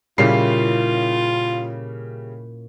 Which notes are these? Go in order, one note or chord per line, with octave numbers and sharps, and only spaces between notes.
A#2 C#3 G3 C#4 E4 F4 C7